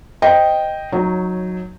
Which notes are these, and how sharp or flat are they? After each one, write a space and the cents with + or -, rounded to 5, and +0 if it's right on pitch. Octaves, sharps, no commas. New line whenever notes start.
C5 +0 D#5 +0 G5 +0
F#3 -15 D#4 +0 C#5 +0